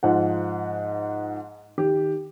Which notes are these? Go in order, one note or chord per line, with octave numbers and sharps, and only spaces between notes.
G#2 F3 F#5
D#3 G4